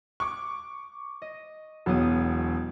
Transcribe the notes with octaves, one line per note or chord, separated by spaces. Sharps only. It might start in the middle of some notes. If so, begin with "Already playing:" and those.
C#6 D6
D#5
E1 B2 F#3 G4 D#6